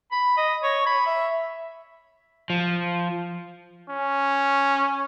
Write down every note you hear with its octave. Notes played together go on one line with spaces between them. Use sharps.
B5
D#5
C#5
B5
E5
F3
C#4